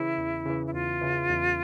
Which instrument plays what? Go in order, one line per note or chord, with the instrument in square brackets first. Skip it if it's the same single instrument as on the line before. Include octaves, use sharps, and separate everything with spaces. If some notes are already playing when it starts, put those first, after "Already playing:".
Already playing: [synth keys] C#3 E3 [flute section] E4
[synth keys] E2
C#3 E3
[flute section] E4
[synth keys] E2 [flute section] F4
[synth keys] C#3 E3
E2